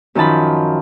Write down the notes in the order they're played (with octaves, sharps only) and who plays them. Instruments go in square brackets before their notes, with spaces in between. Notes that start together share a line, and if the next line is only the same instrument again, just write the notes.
[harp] F#2 D#3 F3 A5 B5